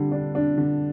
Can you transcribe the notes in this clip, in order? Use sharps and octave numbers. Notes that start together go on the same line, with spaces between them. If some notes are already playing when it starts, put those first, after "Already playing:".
Already playing: D3 G3
D4
D4
D3